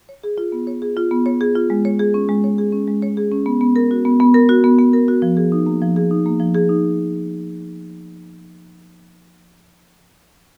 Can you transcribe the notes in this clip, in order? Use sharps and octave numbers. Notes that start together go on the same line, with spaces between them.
C#5
G#4
F4
B3
C#5
G#4
F4
B3
C#5
G#4
F4
G#3
C#5
G#4
C#4
G#3
C#5
G#4
C#4
G#3
C#5
G#4
C#4
B3
B3
A#4
F#4
B3
B3
A#4
F#4
B3
B3
A#4
F#4
F3
G#4
D#4
A#3
F3
G#4
D#4
A#3
F3
G#4
D#4